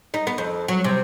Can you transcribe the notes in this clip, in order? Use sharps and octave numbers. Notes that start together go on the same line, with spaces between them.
D#4
B3
F2
F#3
C3